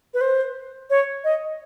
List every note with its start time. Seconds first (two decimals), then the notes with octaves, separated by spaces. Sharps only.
0.14 B4
0.21 C5
0.90 C#5
1.24 D#5